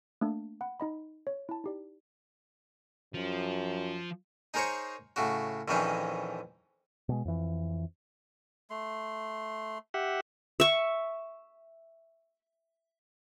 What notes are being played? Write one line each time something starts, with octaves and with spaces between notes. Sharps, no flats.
A3 A#3 D4
F#5 B5
D#4 D#5 B5
C#5
E4 A5
D#4 G4 D5
F#2 F3 F4
D#4 G#4 A#4 C5 C#5 C#6
A2 C#3 F#4
A#1 F2 D#3 E3 C#4 D#4
B2 G#3
F2 E3
A3 C6
G4 E5 F#5
E5 C#6